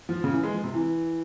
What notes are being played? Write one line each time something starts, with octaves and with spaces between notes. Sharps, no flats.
F3
C#3
E3
G#3
F3
C3
E3